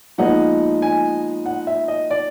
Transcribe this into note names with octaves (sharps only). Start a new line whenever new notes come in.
A#2 F3 G#3 B3 D#4 F#5
G#5
F#5
E5
D#5
D5